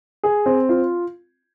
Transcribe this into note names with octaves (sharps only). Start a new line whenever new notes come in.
G#4
C4
F4